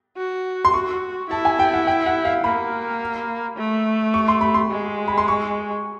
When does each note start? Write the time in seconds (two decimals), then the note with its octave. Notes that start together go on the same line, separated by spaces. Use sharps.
0.17 F#4
0.65 C6
0.74 F#4 C#6
1.30 E4 A5
1.45 G#5
1.59 G5
1.73 F#5
1.87 G5
2.06 F#5
2.25 F5
2.44 A#3 B5
3.57 A3
4.14 C#6
4.28 C6
4.41 B5
4.54 C6
4.71 G#3
5.08 B5
5.18 C6
5.28 C#6